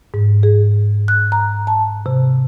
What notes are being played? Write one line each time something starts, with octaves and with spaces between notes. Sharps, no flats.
G#2
G#4
F#6
A#5
A5
C3